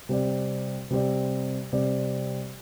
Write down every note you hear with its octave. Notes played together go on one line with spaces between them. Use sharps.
C3 G3 C4 G4 D5
C3 G3 C4 G4 D5
C3 G3 C4 G4 D5